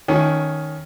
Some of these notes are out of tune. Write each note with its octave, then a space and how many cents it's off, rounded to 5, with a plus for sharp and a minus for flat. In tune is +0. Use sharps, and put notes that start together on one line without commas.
D#3 +0 A3 +0 C#4 +5